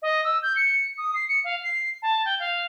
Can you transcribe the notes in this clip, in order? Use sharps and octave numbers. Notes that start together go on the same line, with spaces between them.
D#5
E6
G6
C#7
D#6
C7
C#7
F5
C7
A5
G5
F5